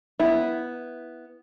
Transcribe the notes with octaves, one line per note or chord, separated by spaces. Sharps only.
B3 E4